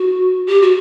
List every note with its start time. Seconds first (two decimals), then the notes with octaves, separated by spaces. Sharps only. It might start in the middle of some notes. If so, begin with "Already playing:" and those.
Already playing: F#4
0.47 G4
0.62 F#4